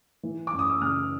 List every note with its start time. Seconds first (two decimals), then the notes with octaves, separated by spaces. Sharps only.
0.23 E3
0.47 D6
0.53 F#2
0.59 D#6
0.70 E6
0.81 C#3 D#6 F6